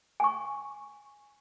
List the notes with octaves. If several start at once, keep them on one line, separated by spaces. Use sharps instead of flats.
G#5 C#6